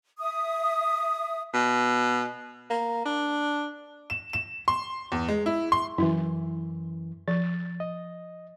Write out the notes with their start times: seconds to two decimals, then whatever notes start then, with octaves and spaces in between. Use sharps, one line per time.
0.20 E5 D#6
1.54 B2
2.70 A#3
3.05 D4
4.10 E7
4.33 E7
4.68 C6
5.12 E2
5.28 G#3
5.46 E4
5.72 C6
5.98 F#2 E3 E4
7.28 F3 A6
7.80 D#5